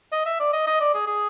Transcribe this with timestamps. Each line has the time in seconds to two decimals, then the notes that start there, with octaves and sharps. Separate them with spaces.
0.12 D#5
0.26 E5
0.40 D5
0.53 D#5
0.67 D#5
0.80 D5
0.94 G#4
1.07 G#4